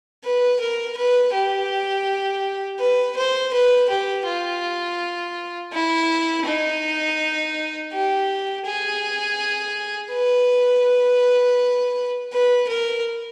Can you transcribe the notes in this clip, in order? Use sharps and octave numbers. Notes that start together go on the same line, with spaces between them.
B4
A#4
B4
G4
B4
C5
B4
G4
F4
E4
D#4
G4
G#4
B4
B4
A#4